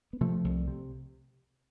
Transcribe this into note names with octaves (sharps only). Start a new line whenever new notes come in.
B3
C3 F3 A3
C2
C3